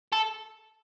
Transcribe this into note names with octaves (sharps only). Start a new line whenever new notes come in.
A4